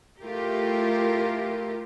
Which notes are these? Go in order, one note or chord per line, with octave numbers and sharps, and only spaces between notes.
A3 E4 F4 G4 A#4